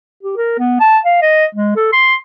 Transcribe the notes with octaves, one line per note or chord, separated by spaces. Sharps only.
G4
A#4
B3
A5
F5
D#5
G#3
A4
C6